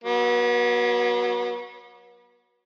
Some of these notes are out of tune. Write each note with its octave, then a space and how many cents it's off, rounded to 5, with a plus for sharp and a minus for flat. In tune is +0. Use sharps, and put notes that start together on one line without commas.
F#3 +0 B3 -40